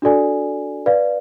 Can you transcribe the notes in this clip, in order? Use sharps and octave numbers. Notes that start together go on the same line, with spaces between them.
D4 F#4 A4 D5 G#5
B4 D5 F5